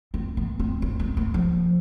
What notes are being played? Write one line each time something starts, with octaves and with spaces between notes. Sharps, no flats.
C4
B3
C4
C4
B3
A#3
F3